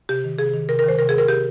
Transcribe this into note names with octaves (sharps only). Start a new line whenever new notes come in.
C3 G4
D#3
C3 G#4
D#3
C3 A#4
A#4
D#3 C5
C3 A#4
G#4
D#3 A#4
C3 G4